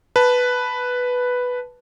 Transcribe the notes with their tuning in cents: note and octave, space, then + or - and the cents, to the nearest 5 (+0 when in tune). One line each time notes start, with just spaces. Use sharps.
B4 +0 A5 +0